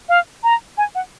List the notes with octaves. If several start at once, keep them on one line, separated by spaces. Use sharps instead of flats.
F5
A#5
G#5
F#5